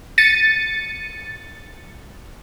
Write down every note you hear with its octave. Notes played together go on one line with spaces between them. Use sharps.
A6 C#7 D#7